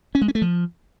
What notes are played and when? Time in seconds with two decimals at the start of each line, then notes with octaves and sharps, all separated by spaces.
0.15 C#4
0.21 G#3
0.28 C#4
0.35 A3
0.42 F3